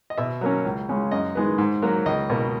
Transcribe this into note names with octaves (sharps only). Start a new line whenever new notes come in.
D#5
B2 E5
F#3 A#3 C#4
C#2
C#3 G#3 C#4
F#2 D#5
D#3 G#3 B3
G#2
F#3 A#3
C#2 D#5
B2 A#3